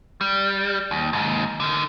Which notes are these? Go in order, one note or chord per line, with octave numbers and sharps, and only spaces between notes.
G3
D#2
D#2 G#2
D3 D#3